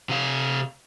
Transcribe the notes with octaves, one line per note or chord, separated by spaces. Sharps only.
C3 F5